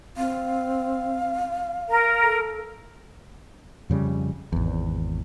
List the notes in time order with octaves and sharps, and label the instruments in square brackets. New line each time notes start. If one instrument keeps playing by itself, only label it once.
[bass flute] C4 [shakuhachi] F5
[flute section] A#4
[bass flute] A4
[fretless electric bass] F2 C#3 G3
G#1 E2